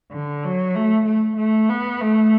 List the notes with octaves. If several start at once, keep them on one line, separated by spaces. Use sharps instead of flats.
D3
F#3
A3
A3
A3
B3
A3